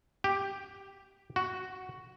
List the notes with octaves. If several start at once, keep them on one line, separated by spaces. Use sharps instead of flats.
G4
F#4